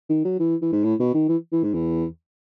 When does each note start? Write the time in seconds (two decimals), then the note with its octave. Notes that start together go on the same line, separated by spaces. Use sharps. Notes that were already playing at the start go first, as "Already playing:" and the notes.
0.10 D#3
0.25 F#3
0.40 E3
0.62 E3
0.72 G#2
0.84 A2
1.00 B2
1.14 D#3
1.28 E3
1.52 E3
1.63 G#2
1.74 E2